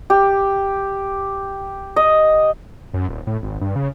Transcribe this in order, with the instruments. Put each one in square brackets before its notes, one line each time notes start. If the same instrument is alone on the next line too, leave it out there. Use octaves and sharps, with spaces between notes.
[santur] G4
D#5
[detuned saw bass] F#2
D#1
A2
G#1
G2
C#3